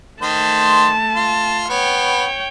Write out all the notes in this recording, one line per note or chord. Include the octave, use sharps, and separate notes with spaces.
D#3 A3 C5 A5 C6
F4
B3 C#5 G5